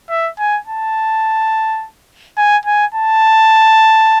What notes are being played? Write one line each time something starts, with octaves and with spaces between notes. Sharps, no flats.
E5
G#5
A5
G#5
G#5
A5